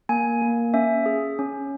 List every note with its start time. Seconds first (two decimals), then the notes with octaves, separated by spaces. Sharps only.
0.09 A#3 G#5
0.42 A#3
0.74 C#4 E5
1.06 G#4
1.39 C#4